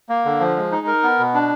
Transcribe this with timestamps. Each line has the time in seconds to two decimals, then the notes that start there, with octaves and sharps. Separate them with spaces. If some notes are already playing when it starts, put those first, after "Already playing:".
0.09 A#3
0.25 D3
0.40 F3
0.57 G#3
0.72 D#4
0.87 A#4
1.03 B3
1.19 B2
1.34 D4